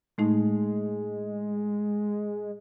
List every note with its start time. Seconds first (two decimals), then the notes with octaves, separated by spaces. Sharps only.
0.18 A2 G#3 A3 D#4